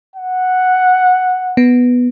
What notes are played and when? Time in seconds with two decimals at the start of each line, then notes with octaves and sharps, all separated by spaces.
0.16 F#5
1.57 B3